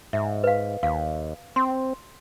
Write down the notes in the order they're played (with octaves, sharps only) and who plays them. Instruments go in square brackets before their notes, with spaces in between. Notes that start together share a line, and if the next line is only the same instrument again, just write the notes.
[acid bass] G#2 [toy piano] E5
[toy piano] B4 F5
[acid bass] D#2 [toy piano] F5
[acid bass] C4 [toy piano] C6